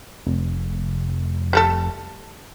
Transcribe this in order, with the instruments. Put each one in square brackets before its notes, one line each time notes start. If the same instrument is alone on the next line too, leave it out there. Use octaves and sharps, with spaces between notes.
[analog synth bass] F1
[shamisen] G3 A3 A4